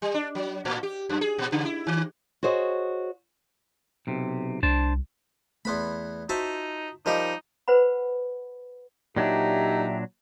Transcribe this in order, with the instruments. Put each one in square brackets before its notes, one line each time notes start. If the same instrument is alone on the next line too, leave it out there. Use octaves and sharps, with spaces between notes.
[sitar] G3
D4
F#3
A2
G4
F#2
G#4
A#2
C#3
E4
D#3
[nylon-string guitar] F#4 G#4 C5 C#5 D#5
[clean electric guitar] B1 C3
[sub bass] C2 [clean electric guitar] D4 C5 A5
[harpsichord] E2 B3 B5 [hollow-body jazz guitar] A3 B4 C6
[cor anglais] D#4 [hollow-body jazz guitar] F4 F#4 [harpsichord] C5 E5 A5
[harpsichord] F3 G3 G4 [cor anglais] D#4 [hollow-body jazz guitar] A#4 D#5
[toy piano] B4 C5 F#5 B5
[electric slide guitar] A#2 F#3 D4 [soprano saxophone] D#4 [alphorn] G4 [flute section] E5 G5 A#5